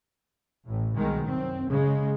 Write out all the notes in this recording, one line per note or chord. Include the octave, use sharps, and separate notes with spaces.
A1 A2
C2 B2 D#3 G#3
F#2 C4
C#3 G#3